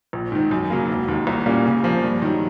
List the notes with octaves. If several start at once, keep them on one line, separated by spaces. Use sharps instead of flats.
A#1
G#2 D#3
F#2
C#3 F#3 A#3
E1
D#2 D#3
C2
A#2 G3 A#3 C#4
C#3
F3 A#3
G2
D#3 F#3